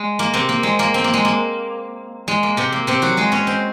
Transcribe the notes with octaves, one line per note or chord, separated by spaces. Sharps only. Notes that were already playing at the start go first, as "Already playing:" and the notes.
Already playing: G#3
A#3
C3 C4
A#3
G#3
A#3
C4
A#3
G#3
A#3
G#3
A#3
C3 C4
A#3
C3 C4
F#3 F#4
G#3 G#4
C#4 C#5
C4 C5